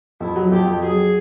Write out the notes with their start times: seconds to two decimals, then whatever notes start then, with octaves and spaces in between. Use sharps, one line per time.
0.20 F2 E4
0.36 F#3
0.51 F2 G4
0.67 F2
0.82 F#3 G#4